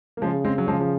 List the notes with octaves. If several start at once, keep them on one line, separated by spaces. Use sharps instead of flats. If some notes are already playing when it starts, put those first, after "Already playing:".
A#3
C#3 F3 G#3
G#3 C4
F#3
C#3 F3 G#3
F3